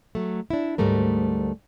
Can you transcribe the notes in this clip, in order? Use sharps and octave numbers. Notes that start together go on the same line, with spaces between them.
F#3 A3
D4 E4
D2 G#2 G3 A3 A#4